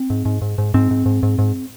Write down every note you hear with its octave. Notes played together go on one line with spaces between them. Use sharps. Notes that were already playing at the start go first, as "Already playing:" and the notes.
Already playing: C4
G#2
G#2
G#2
G#2
G#2 C4
G#2
G#2
G#2
G#2